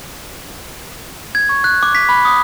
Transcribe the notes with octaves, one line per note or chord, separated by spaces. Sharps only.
G#6
C#6
F#6
D6
B6
B5
D#6